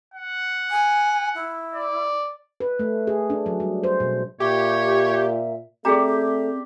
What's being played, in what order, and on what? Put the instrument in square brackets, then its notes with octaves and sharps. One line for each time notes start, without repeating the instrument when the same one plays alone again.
[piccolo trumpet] F#5
[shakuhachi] G#5
E4
[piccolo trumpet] D5
[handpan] B4
A3
G#4
D4
F#3
G3
C5
B2
[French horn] A#2 [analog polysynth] G4 [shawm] C#5 [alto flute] E5
[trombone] A3 [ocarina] C4 [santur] G4 D5 [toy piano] G#4 G5 A#5